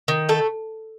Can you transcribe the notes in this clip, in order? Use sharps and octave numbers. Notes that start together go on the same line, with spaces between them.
D#3
A3 A4